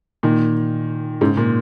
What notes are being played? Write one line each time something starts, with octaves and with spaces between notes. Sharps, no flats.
A#2 D#3
G#2 C#3
A#2